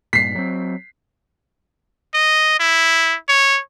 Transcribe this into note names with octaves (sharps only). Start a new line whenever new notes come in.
G2 A#2 B6 C7
F#3 G3 C4
D#5
E4
C#5